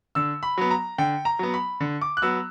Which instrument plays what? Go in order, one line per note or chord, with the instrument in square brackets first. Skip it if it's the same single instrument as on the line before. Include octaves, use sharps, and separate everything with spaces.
[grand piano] D3 E6
B5
F#3 B3
A#5
D3 G5
A#5
F#3 B3
B5
D3
D6
F#6
F#3 B3 E6